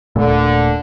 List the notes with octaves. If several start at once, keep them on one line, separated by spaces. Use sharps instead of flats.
D#1 A#2 D3 A3